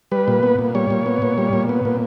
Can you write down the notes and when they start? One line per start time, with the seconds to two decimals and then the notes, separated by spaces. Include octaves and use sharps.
0.12 G3 B4
0.28 A#2
0.43 B3
0.59 A#2
0.75 G3 C#5
0.90 A#2
1.06 B3
1.22 A#2
1.38 G3
1.53 A#2
1.69 B3
1.85 A#2